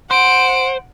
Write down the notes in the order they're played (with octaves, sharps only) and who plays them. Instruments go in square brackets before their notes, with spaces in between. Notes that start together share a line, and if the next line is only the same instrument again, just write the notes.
[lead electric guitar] C5 [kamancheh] F#5 [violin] D7